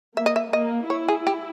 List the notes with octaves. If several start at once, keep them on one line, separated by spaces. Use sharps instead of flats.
A#3 E5
D#5
E5
A#3 D#5
E4 C#5
G#4
G4